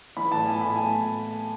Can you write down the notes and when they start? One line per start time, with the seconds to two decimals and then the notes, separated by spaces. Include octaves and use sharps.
0.17 E3 B5
0.31 A2 A5
0.46 A2 G#5
0.61 A2 B5
0.75 A2 G#5